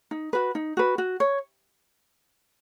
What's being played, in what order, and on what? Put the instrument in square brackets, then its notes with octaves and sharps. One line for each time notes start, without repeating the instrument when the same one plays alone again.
[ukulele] D#4
F#4 B4
D#4
F#4 B4
F#4
C#5